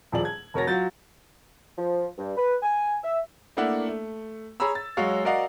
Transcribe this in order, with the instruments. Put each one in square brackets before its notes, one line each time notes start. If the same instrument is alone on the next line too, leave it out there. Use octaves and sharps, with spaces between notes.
[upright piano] D#1 F3 G#4 D5 F#7
G#6
F1 F#4 A#4 C#5 A6 A#6
F#3 F4 G6 A6
[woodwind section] F3
G2
B4
G#5
E5
[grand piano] A3 A#3 D4 E4 F#5
A3
G#4 C#5 A#5 B5 E6
A6
F#3 G#3 F#4 C#5 F5
F#4 A#4 D5 D#5 F5 F#5